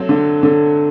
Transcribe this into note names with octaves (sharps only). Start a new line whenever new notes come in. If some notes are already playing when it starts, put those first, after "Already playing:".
Already playing: F#3 A3 C4
D3
D3